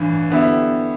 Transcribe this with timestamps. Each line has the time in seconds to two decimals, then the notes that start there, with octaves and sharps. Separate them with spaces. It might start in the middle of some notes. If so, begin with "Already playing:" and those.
Already playing: A1 G2 E3
0.30 D3 B3 E4 G4 E5